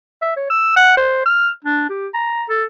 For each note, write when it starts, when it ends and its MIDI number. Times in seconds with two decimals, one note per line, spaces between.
0.21 0.33 76
0.36 0.49 73
0.50 0.75 88
0.76 0.97 78
0.97 1.20 72
1.26 1.49 89
1.64 1.89 62
1.89 2.08 67
2.14 2.44 82
2.49 2.64 69